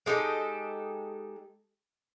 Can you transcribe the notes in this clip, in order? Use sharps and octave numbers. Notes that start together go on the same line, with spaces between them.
G#3 D#4 G4 A4